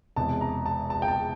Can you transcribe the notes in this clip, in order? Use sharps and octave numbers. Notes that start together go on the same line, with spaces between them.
E1 E2 C3 A5
A#5
A5
A5
G5
A5